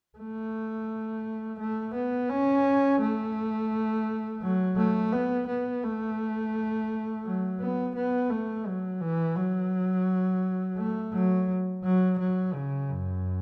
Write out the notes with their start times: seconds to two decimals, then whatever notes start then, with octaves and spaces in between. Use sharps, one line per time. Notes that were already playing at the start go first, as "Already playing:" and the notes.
0.18 A3
1.59 A3
1.95 B3
2.30 C#4
3.01 A3
4.42 F#3
4.77 A3
5.12 B3
5.48 B3
5.84 A3
7.25 F#3
7.60 B3
7.96 B3
8.30 A3
8.66 F#3
9.01 E3
9.36 F#3
10.78 A3
11.14 F#3
11.84 F#3
12.19 F#3
12.54 C#3
12.89 F#2